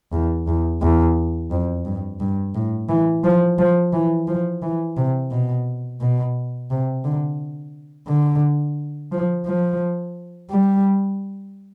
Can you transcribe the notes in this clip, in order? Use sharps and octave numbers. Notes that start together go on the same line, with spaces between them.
E2
E2
E2
F2
G2
G2
A2
E3
F3
F3
E3
F3
E3
C3
B2
B2
C3
D3
D3
F3
F3
G3